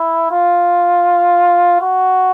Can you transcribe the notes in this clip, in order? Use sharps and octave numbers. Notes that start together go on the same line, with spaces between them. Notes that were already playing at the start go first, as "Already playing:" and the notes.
Already playing: E4
F4
F#4